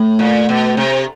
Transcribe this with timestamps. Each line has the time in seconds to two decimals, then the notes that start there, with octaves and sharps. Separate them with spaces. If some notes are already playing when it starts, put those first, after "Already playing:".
Already playing: A2 A3
0.19 A#2
0.49 B2
0.77 C3